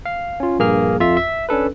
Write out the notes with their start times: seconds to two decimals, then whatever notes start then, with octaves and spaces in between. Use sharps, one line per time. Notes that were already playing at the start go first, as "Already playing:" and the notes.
0.06 F5
0.40 C#4 F4
0.59 A#1 G2 A#3 G#4 F6
1.00 F2 F4 E5
1.17 E5
1.49 C#4 D4 A4 B4